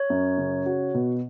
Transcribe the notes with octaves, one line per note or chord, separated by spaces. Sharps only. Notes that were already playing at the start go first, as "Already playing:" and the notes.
Already playing: C#5
F#2
C#3
F#4
B2